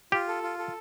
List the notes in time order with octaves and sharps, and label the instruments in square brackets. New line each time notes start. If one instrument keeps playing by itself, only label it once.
[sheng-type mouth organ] F4 [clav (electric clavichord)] G4
[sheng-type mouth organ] A4
F4
A4